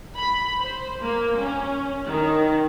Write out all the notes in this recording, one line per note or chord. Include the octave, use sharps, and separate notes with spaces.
B5
C5
A#3
C#4
D#3